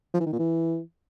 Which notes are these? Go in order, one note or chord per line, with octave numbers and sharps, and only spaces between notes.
F3
E3
D#3
A#2
E3